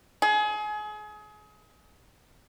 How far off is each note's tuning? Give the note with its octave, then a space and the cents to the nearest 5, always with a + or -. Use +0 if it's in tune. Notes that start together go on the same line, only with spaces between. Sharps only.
G#4 +30